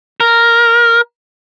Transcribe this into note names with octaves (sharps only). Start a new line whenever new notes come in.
A#4